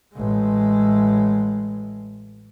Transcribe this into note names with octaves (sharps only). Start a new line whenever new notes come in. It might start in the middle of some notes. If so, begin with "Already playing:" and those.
A1 G#3